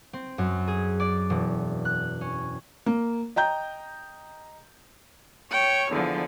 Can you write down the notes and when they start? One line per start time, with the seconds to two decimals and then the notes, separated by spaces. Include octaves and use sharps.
0.13 C4
0.38 F#2
0.68 G#4
1.00 D5
1.30 E1
1.85 F#6
2.21 C#4
2.86 A#3
3.36 D#5 G5 A#5 G6
5.53 C#5 G5 C#6
5.92 E2 D3 F3